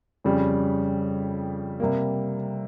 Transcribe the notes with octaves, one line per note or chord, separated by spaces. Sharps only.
F2 C#3 G3
C3 G3 A#3